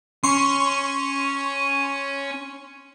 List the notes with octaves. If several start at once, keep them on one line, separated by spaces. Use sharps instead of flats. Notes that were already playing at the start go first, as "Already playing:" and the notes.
C#4 C6 C#6